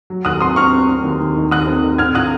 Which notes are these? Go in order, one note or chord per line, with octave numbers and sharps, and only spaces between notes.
F#3
D#2 D#6 F#6
C4 C6 D#6
C4 C#6 F6
C4
C4
D#2
D#2
D#3
D#2 D#6 F#6
C4
D#3
C4 F6 G#6
F4 D#6 F#6